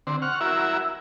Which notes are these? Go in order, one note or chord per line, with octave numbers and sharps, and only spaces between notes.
D3 C4
F#5 C#6 F6
E4 F#4 A#4 E5